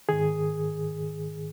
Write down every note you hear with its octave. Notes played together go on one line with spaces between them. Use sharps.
G#2 D#3 G#4